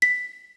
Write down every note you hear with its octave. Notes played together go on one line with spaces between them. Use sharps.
B6